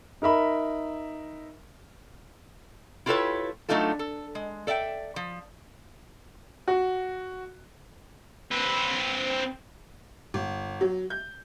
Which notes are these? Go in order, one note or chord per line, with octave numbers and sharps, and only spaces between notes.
D#4 A#4 E5 B5
E4 F4 G4 A4 B4 C#5
F#3 A3 D4 D#4 F4 A4
A4
G#3
A4 D5 E5 F#5 G5
F3
F#4
C4 B4
G1
F#3
G6